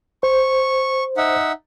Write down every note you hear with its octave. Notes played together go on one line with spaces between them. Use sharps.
C5 C#6
D#4 E5 F#5